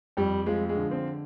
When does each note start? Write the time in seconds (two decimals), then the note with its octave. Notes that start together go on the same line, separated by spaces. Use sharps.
0.17 F2 G3
0.46 F3 G#3
0.69 G#3
0.76 D3
0.91 C4